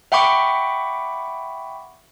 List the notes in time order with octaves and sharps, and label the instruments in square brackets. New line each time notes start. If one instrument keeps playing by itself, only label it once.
[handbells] E5 F#5 G5 B5 C#6 D6